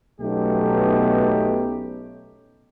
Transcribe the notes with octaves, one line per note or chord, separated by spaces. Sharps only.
B1 A3 B3 C#4 D#4 G4